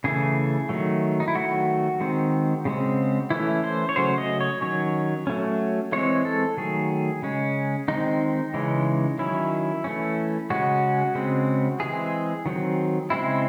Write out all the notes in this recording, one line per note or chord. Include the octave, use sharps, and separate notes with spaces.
C#3 E3 A3 G#4
D#3 F#3 A3
D#4
E4
D#3 F#3 A3 F#4
D#3 G#3 C4
C#3 G#3 C4
E3 A3 C#4 E4
C5
C#5
C#3 F#3 A3 C#4 C5
D#5
C#5
D#3 F#3 C#4 C#5
F#3 A3 C#4
E3 G#3 C4 C#5
A4
D#3 F#3 A3 G#4
C#3 G#3 C#4
D#3 G#3 C4 D#4
C#3 E3 G#3 C#4
D#3 F#3 C#4 E4
E3 A3 C#4
C#3 G#3 C#4 F#4
C#3 G#3 C4
E3 G#3 C4 G#4
D#3 F#3 C4
C#3 G#3 C4 E4